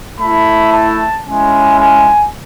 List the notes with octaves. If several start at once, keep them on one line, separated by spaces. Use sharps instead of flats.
A3 E4 B5
A5
G#3 C#4 E4 G#5
G#5